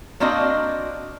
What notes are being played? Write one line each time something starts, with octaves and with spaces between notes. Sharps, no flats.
A#3 C4 D4 F#4 D#5